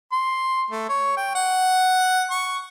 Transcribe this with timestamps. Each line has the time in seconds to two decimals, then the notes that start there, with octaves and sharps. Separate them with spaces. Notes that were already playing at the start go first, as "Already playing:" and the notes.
0.12 C6
0.71 A3
0.89 C#5
1.17 G5
1.35 F#5
2.30 C#6